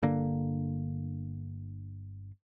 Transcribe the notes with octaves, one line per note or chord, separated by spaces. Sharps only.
G1 D3 A#3